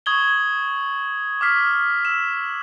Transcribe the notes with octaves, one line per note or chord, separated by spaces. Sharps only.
C#6 D#6 G#6 F#7 G7
D6 D#6 F6 B6 C7
E6 E7